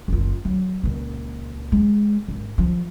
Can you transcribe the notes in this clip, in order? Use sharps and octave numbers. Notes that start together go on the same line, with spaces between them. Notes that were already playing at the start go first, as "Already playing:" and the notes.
F#1 F4
F#3
C#2 A#2
G#3
G#1
F3